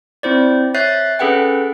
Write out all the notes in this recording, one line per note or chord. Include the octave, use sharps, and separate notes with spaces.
C4 E4 C5 D5
C#5 E5 F#6 G6 A6 C7
C#4 G#4 A4 B4 F#5 G5